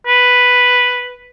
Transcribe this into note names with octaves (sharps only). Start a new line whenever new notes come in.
B4